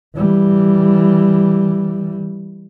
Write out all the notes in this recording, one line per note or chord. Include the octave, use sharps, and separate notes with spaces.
E3 G3